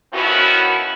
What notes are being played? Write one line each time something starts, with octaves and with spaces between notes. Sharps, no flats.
D#3 F3 B3 C#4 E4 F#4